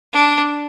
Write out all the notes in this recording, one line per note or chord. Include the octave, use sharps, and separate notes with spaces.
D4